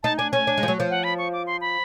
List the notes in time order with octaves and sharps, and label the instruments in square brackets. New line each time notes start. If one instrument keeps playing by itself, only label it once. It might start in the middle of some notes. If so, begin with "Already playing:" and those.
[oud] D#4 [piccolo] A5
[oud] D4 [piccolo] G#5
[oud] C#4 [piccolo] G#5
[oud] D4
G#3
F3
F#3
F3
[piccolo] F#5
B5
C#6
D6
C6
B5